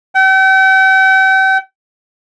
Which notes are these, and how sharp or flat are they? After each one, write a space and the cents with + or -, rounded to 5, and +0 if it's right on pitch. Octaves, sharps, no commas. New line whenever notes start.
G5 -40